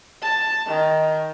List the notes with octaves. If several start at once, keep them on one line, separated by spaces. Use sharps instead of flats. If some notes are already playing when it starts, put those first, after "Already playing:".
A5
D#3